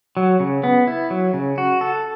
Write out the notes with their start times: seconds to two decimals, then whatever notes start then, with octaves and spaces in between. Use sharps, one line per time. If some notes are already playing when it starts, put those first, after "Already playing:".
0.17 F#3
0.40 C#3
0.64 B3
0.87 E4
1.10 F#3
1.34 C#3
1.58 F#4
1.81 A4